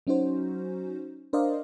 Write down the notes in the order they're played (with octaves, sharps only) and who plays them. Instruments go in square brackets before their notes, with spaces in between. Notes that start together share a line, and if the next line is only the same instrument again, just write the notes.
[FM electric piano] F#3 C#4 D#4 F#4 C5
D4 A#4 C5 D5 D#5 F5